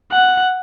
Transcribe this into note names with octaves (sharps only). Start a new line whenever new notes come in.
F#5